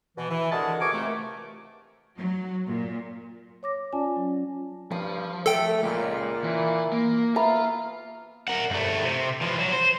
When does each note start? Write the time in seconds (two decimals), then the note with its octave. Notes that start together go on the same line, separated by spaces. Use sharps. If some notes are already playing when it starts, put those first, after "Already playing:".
0.17 B2 E3
0.30 E3
0.51 D3 G#3 F#4 G#4 A#4 A5
0.80 C#2 C3 A#4 G#5 C#6 D6
0.92 C3 E3 F3 A3
2.18 F#3
2.68 A#2
3.63 C#5 D6 A#6
3.93 C#4 F4 D5 G#5 A5
4.16 F#3
4.91 G2 F3 D#6
5.46 A3 A4 G5
5.83 C#2 A#2
6.44 E3
6.92 A#3
7.36 B3 F4 E5 A#5 B5
8.48 A#4 F#5
8.71 G2 A3
9.04 C3
9.42 E3 F3
9.59 F#3
9.73 C5